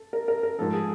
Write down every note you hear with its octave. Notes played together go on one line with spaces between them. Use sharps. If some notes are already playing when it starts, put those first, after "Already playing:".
Already playing: A4
A#4
A#4
A#4
G#2 F3 A4
G#4